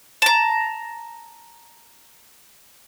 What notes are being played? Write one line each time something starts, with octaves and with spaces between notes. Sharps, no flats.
A5 A#5